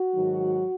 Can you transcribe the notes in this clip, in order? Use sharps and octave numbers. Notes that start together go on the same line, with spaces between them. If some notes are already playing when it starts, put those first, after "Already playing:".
Already playing: F#4
G#2 D#3 F#3